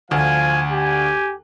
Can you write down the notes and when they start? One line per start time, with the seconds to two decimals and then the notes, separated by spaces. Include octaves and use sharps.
0.11 D2 F3 F5 G#5
0.72 G4 G#5